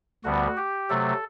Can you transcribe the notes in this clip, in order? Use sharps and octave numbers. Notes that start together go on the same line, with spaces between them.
D2 D3 G3 B3 F#4
G4
C3 F#3 A3 A4